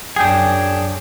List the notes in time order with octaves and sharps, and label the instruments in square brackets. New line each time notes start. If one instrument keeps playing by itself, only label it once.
[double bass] F#2 [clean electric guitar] D4 G#4 [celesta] G5 G#5 G6